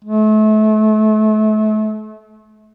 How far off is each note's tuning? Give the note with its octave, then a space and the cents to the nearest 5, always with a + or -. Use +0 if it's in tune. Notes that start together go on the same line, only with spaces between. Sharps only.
A3 -35